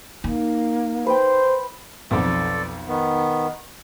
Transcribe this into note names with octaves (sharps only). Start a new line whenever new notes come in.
A#3 D#4
B4 C5 G5
B1 F2 A4 D5
D#3 B3